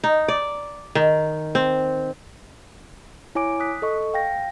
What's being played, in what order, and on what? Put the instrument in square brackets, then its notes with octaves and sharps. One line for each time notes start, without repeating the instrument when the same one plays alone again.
[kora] D#4
D5
D#3
C4
[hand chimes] E4 C#5 G#5 D6 D7
D#6 F#6 B6
A4 D#5 C#6
F5 G5 A#6